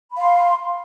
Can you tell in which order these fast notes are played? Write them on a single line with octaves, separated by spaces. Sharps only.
B5 F5 C6